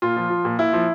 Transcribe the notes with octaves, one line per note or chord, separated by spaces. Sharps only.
A#2 F4
F3
F3
A#2
A#2 E4
F3